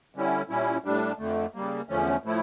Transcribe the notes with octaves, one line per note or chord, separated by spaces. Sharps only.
D3 G3 C#4 E4
A#2 G3 C#4 E4
A2 G3 D4
F2 D3 A3
C#3 G3 A#3
E2 D3 F3 A3 C#4
A2 F3 A3 E4